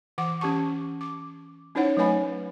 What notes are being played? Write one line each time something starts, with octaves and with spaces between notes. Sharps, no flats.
E3 F#5 D6
C#4 G4 A5 C#6
D6
C#4 D#4 E4 C5 C#5 F#5
F#3 A3 B4 C#5 G#5 B5